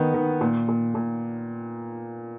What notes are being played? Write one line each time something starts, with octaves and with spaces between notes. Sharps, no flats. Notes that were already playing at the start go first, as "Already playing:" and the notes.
Already playing: D#3 B3
D#3
A#2
A#2
A#2